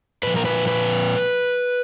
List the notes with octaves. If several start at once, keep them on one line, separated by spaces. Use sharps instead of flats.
A#2 F3 B4
A#4
B4
B4